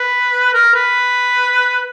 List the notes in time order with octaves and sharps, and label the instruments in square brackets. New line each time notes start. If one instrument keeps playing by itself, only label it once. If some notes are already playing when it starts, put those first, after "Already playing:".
Already playing: [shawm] B4
A#4
B4